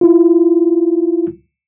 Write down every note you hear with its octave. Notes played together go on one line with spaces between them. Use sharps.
E4 F4